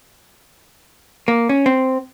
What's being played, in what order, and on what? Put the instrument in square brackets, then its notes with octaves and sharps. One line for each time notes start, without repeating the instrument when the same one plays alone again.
[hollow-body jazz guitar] A#3
C#4
C4